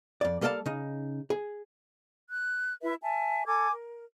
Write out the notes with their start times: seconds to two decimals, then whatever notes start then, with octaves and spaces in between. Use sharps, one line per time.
0.21 F2 D5
0.41 G3 A#3 A4 D5 F5 A5
0.66 C#3 D#4
1.30 G#4
2.29 F#6
2.83 E4 B4 E5
3.02 E5 G#5 A5
3.46 A4 G#5 D6 G#6
3.72 A#4